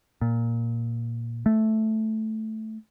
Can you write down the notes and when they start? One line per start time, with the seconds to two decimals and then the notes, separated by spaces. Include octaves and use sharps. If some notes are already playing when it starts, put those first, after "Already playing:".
0.21 A#2
1.46 A3